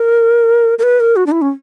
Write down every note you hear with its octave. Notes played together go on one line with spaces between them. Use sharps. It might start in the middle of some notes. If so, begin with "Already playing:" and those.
Already playing: A#4
A#4
B4
A#4
F#4
D4
E4
C#4